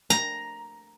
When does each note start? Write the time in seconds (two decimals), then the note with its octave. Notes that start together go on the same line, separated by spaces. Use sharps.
0.10 A#5